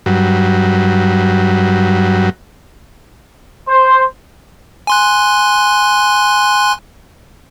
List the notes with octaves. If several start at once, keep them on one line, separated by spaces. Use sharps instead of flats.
G2 F#3
C5
G#5 C6 F#6